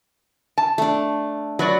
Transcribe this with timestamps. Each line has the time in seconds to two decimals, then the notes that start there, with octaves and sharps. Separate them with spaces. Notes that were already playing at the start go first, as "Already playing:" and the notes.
0.58 A5
0.78 A3 D4
1.59 F#3 F#4 B4 D5